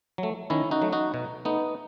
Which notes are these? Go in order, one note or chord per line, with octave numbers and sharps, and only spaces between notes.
F#3 A3
D#3 C#4 E4
D#4 F#4
F#3 A3
D#4 F#4
B2
A3 B3 D#4